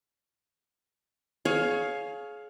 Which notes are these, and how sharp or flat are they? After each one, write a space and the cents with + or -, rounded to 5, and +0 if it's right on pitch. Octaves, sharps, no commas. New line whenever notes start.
G#4 +30 C#5 +0 F5 +10